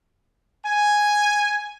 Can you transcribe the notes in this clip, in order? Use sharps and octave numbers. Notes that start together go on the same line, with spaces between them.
G#5